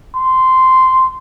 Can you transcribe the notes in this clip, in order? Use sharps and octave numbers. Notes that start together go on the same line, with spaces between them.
C6